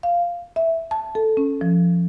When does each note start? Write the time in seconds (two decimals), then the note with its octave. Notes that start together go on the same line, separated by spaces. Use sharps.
0.03 F5
0.56 E5
0.91 A5
1.15 A4
1.37 C#4
1.61 F3